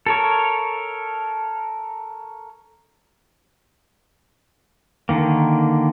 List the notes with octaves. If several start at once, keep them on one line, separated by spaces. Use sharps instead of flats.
A4 A#4 C#5
D3 D#3 A#3